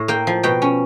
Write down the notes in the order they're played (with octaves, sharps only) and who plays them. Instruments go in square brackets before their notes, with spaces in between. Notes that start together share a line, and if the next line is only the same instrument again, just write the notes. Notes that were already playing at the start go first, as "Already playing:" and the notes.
Already playing: [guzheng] A2
A#3 G5
F3
B2 G5
C#4